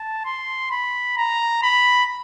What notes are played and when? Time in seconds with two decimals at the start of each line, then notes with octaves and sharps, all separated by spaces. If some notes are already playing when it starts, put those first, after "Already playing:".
Already playing: A5
0.25 C6
0.71 B5
1.17 A#5
1.63 B5